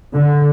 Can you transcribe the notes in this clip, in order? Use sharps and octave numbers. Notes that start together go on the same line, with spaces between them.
D3